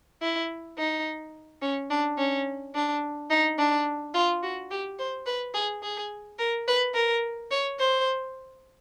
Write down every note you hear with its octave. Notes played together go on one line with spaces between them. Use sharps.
E4
D#4
C#4
D4
C#4
D4
D#4
D4
F4
F#4
G4
C5
B4
G#4
G#4
A#4
B4
A#4
C#5
C5